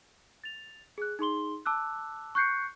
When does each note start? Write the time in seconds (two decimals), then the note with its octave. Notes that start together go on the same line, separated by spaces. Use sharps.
0.44 A6 F7
0.98 G#4 F#6
1.19 D#4 G#4 C6 G7
1.66 A5 D6 E6 F#6
2.35 C#6 F#6 G6 C7 C#7